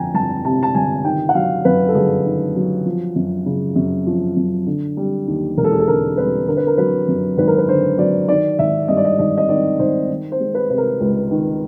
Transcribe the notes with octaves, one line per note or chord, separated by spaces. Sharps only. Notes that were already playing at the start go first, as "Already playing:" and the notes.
Already playing: G1 F2 G5 G#5 A#5
G1 A5
C3 A5
A5
G1 G#5
D#3 G5
F#5
F#3 F5
F#2 B4
A4
G1 G#4
D#3
F#3
F3
F#2
C#3
F#2
F3
F#2
D3
G3
D#2
E1 A#4
A4
G#4
A4
D3 A#4
G3 B4
D3 A#4
B4
A#4
F#3 B4
F#2
G#1 B4
A#4
B4
D3 C5
F#3 D5
D#3 D5
G#1 E5
G2 D#5
D5
D#5
G#1 D#5
D#5
D#3 D5
G#1 C5
D#3
C5
G#3
B4
C3 B4
A#4
C#2
D#3